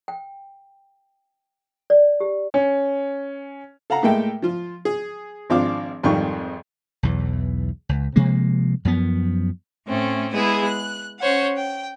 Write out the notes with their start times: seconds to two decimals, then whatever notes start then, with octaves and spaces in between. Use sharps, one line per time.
0.08 G5
1.90 D5
2.20 G4
2.54 C#4
3.90 A4 F5 F#5 A#5
4.03 A2 G#3 A#3 A4 E5 G5
4.42 F3 F4
4.85 G#4
5.50 G#1 F3 C4 D4 F5 D6
6.03 G#1 F2 D#3 G3 C#6
7.03 B1 E2 E3
7.89 C#2
8.16 C3 F3 G#3 A#3
8.85 F#2 F3 B3
9.86 A2 A3 C4 C#4
10.32 G#3 B3 E4 G#4 D#5
10.64 F#6
11.20 C#4 C5 C#5 F#5
11.57 G5